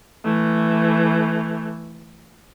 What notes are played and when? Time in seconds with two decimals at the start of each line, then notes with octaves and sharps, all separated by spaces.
0.25 E3 A3